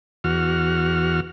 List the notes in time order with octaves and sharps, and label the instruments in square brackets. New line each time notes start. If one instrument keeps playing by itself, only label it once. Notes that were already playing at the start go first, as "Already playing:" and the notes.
[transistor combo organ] E2 F#4 F6